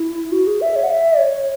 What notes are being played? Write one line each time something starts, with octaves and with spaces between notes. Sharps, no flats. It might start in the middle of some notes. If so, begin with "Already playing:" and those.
Already playing: E4
F#4
G#4
E5
C#5
F#5
E5
C#5